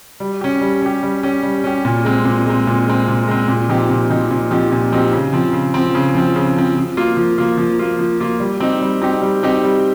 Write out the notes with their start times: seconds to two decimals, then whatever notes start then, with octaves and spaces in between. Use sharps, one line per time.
0.20 G3
0.41 C#4 G4
0.61 G3
0.82 C#4 G4
1.03 G3
1.23 C#4 G4
1.43 G3
1.64 C#4 G4
1.85 A#2
2.05 G#3 C4
2.25 A#2
2.46 G#3 C4
2.67 A#2
2.87 G#3 C4
3.08 A#2
3.27 G#3 C4
3.48 A#2
3.69 F3 C4 D#4 G4
3.90 A#2
4.10 F3 C4 D#4 G4
4.31 A#2
4.51 F3 C4 D#4 G4
4.72 A#2
4.92 F3 C4 D#4 G4
5.13 C#3
5.33 F3 C4
5.53 C#3
5.74 F3 C4
5.95 C#3
6.15 F3 C4
6.36 C#3
6.56 F3 C4
6.77 F3
6.97 A#3 F4
7.17 F3
7.38 A#3 F4
7.58 F3
7.79 A#3 F4
7.99 F3
8.20 A#3 F4
8.40 G3
8.60 C4 D#4 G4
8.81 G3
9.02 C4 D#4 G4
9.22 G3
9.43 C4 D#4 G4
9.64 G3